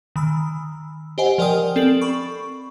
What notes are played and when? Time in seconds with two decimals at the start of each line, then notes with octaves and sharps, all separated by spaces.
0.16 D#3 B5 E6
1.18 G4 C5 D#5 F#5 G#5
1.38 F3 A#4 D5 G5 G#5 D#6
1.76 C4 A4 A6 D7 F#7
2.01 B5 C#6